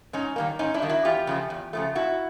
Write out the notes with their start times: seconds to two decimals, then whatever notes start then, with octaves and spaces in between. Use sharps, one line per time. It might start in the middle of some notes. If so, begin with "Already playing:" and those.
0.13 G#2 C#4 D#4
0.36 D#3 G3 A#3
0.59 G#2 C#4 D#4
0.74 D4 E4
0.82 D#3 G3 A#3
0.90 E4 F#4
1.05 E2 F4 G4
1.27 C#3 F3 A3
1.50 E2
1.73 C#3 F3 A3
1.95 A#2 E4 F#4